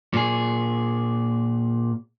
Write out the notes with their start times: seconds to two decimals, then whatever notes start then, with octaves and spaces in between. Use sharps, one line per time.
0.13 A#2 G#4